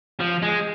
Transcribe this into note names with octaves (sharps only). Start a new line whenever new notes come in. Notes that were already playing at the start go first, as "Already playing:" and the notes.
F3
G#3